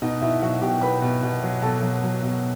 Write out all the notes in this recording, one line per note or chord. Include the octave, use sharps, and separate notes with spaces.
B2 D#4 D#5
B2 E4 E5
F#3 F#4 F#5
B2 G4 G5
B2 B4 B5
B2
B2
F#3
B2 A4 A5
F#3
F#3
B2